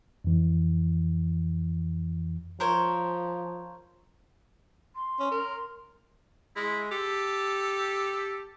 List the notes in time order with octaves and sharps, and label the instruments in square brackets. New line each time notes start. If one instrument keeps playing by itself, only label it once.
[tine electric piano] F2 E3
[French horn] F3 [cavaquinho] A#4 C5 C#5
[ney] C6
[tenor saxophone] C#4
A#4
[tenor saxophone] G#3 [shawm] E4
[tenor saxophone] G4 [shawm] A4